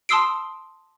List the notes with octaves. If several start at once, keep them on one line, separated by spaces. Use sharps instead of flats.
A5 C6 D#6 E6 C7 D7